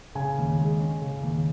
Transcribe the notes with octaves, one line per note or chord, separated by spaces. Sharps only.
C#3 G#5
D#2
G#3
C#4
C#3
D#2